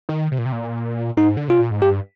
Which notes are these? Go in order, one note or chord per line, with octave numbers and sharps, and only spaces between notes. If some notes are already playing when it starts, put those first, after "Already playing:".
D#3
C3
A#2
C3
A#2
G#2 D#4
D3
C3 F4
A#2
G#2
G2 G4